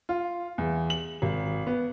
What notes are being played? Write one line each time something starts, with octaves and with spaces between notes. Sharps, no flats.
F4
E2
F#7
G#1
B3